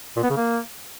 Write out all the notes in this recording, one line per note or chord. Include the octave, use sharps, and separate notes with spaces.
A#2
B3
C#3
A#3